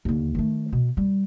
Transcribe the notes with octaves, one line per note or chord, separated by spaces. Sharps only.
D#2 D3
D#3 A3
B2
G3